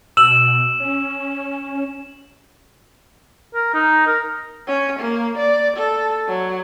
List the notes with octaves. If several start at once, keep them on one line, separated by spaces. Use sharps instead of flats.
B2 E6 E7 F#7
C#4
A#4
D#4
A#4
C#4
A#3
D5
A4
F#3